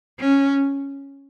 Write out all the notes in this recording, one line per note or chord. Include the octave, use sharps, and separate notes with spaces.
C#4